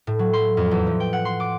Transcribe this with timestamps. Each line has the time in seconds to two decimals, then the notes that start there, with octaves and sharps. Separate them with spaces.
0.07 A2
0.19 F#3
0.33 C6
0.57 F2
0.71 E2
0.87 F3
1.00 G5
1.13 F#5
1.25 C6
1.40 D6